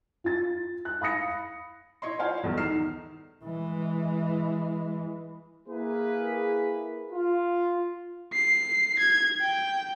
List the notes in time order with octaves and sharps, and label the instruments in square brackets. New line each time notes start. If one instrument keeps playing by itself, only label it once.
[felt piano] F4 A6
F#6
F5 B5 D#6 A#6 C#7
E4 C#5 D#5 C6
F4 C5 D5 F5 G#5
B1 E2 G2 A3
D#3 D#4 F6 C7 E7
[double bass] E3 G#3
[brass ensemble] A#3 E4 G#4 B4
F4
[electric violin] C7
G#6
G5